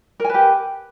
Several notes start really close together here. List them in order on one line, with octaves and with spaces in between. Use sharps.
A#4 G#5 B4 G4